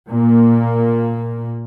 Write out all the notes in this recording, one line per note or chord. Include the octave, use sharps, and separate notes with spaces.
A#2 A#3